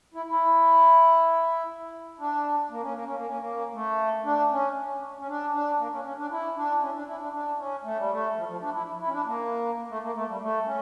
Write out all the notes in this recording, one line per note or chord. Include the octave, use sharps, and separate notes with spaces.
E4
E4
D4
A#3
C#4
A#3
C#4
A#3
C#4
A#3
A3
D4
C#4
C#4
D4
D4
A#3
C#4
C#4
D4
E4
D4
C#4
D4
E4
D4
D4
C#4
A3
G3
A3
F3
F3
D4
E4
E4
C#4
D4
A#3
A3
A#3
A3
G3
A3
C#4